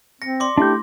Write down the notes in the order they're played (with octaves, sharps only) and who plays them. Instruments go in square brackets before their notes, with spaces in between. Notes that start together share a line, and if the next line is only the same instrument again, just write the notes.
[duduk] C4 [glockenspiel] A#6 [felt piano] C#7
[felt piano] D5 [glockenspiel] C6 D6
[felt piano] A3 E4 [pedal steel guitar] D4 G6 [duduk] G4